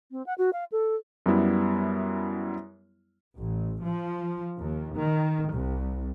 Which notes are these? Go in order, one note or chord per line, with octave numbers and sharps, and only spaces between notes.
C4
F#5
F#4
F5
A4
F#2 G3 B3 E4
A1
F3
D#2
D#3
C2